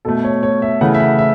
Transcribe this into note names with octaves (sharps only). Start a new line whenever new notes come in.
B2 A3 A4
C#5
C#5
E5
C#3 E3 A3 F#5
E5
F#5
E5